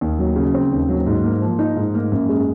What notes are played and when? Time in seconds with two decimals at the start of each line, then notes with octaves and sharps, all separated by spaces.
0.01 D#2
0.19 F#3
0.36 C#3
0.54 C4
0.72 D#2
0.89 F#3
1.06 G#2
1.24 A#3
1.42 F3
1.59 D#4
1.76 G#2
1.95 A#3
2.12 F#2
2.29 G#3